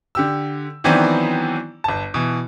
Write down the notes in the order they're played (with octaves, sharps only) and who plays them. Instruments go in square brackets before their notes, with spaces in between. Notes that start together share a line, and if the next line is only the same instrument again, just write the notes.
[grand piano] D3 G4 E6
D#3 E3 F#3 B3 C4 D4
G1 A5
B2 E3